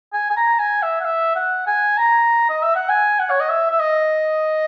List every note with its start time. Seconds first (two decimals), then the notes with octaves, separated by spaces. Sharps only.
0.13 G#5
0.30 G#5
0.36 A#5
0.59 G#5
0.83 E5
1.00 F#5
1.05 E5
1.35 F#5
1.67 G#5
1.97 A#5
2.49 D#5
2.63 E5
2.75 F#5
2.89 G#5
3.19 F#5
3.30 C#5
3.40 D#5
3.49 E5
3.71 E5
3.80 D#5